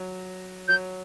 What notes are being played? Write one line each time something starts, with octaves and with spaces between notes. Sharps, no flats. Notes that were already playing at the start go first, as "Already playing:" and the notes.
Already playing: F#3
F#3 G6